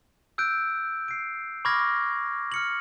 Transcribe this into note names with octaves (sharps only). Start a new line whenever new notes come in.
E6 F#6 G6 D7
C7 D7
B5 C#6 D6 F6 G#6 A#6
F6 C#7 F#7